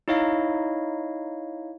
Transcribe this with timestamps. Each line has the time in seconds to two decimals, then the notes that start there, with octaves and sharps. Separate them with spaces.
0.08 D#4 E4 C#5 D#5 F5